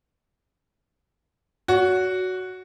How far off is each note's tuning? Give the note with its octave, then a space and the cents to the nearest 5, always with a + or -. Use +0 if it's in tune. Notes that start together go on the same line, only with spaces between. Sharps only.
F#4 +0 C#5 +40